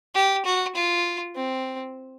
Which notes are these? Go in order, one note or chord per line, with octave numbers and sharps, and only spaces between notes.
G4
F#4
F4
C4